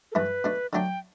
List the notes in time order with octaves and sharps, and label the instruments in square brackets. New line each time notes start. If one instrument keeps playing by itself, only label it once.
[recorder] A4
[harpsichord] G2 E3 A3 E4 [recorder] B4
[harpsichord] B2 A3 D4
[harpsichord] D3 F#3 A3 D4 [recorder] G5